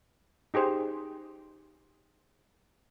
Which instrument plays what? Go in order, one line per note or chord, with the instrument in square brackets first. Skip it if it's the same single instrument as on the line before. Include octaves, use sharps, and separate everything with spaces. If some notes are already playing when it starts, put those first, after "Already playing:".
[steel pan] D#4 G4 G#4 C5